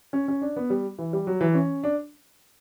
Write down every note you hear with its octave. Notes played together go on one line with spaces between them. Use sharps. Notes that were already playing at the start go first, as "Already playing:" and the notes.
C#4
C#4
D4
B3
G3
E3
G3
F#3
E3
C#4
D4